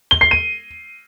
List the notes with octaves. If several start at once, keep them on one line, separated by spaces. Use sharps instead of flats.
G7
C7
D#7